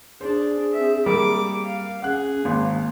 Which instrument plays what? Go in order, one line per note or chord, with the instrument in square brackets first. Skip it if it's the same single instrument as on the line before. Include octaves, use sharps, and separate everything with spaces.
[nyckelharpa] D4 [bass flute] G#4 [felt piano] C5
[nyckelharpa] C4 E5
[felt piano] G3 A#3 [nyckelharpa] D6
[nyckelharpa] F5
[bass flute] C#4 [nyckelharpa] G#4 [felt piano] F#5 F#6
[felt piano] G#1 [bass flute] A#3